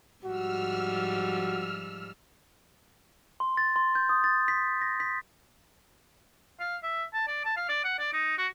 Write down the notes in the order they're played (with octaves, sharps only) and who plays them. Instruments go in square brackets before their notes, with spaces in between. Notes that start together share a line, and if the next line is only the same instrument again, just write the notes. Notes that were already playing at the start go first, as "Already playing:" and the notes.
[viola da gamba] G#2 F3 G3 [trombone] F#4 [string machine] E6 F6
[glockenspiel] C6
A6
C6
G6
D#6
A6
B6
A#6
B6
[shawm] F5
E5
A5
D5
A5
F5
D5
F#5
D5
D#4
F#4